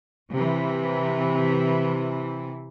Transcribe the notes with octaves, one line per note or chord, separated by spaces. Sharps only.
C3 E3